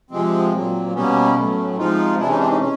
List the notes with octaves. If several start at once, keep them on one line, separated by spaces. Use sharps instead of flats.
C3 F3 G#3 C4
A#2 F#3 A#3
B2 G3 A#3 B3 C#4
A2 F#3 A3
C3 F3 G#3 D#4 F4
C3 E3 G#3 D4 E4
C#4 D#4
C4 D4
C#4 D#4
C#4